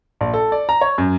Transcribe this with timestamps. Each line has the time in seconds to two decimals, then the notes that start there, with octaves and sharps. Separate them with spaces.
0.21 A#1
0.34 A4
0.52 D5
0.69 A#5
0.81 C#5
0.98 F#2